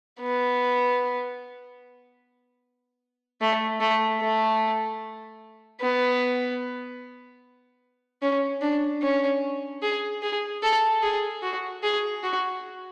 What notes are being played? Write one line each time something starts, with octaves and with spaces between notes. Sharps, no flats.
B3
A3
A3
A3
B3
C#4
D4
C#4
G#4
G#4
A4
G#4
F#4
G#4
F#4